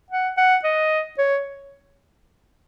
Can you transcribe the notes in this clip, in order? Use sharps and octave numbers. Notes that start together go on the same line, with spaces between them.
F#5
F#5
D#5
C#5